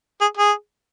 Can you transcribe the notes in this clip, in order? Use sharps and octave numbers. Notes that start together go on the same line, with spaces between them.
G#4
G#4